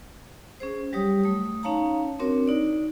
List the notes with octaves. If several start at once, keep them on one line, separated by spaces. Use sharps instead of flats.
C#4 G#4 C5
F#3 G3 G4 C#5 D#6
A3 D#6
C#4 D#4 C#5 F5 A5 A#5
C4 D4 F#4 A#4 C#5
D#4 D5